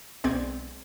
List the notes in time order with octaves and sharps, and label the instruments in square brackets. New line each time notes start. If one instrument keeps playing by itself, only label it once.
[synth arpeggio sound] B1 G#3 B3 C4 D5 G#6